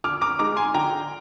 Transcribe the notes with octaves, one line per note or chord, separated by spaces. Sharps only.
D3 D6 F6
A#5 D6
G#3 D#4 A#5 D6
G#5 C6
D3 G5 A#5